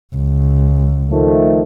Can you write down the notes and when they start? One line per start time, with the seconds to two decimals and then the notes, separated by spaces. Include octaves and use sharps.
0.15 C#2
1.11 D#3 F3 A3